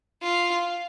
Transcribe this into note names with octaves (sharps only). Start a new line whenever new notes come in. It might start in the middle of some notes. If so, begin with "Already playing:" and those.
F4